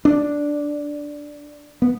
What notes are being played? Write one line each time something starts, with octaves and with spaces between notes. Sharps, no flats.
D4
B3